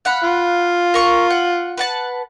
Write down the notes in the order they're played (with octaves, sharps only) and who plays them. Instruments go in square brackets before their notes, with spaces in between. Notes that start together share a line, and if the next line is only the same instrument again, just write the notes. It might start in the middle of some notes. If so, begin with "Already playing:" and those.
[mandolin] F5 F#5 B5
[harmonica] F4
[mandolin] A#4 C#6
F#5
B4 F#5 A5